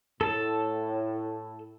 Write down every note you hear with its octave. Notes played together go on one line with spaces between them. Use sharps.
A2 A4 A5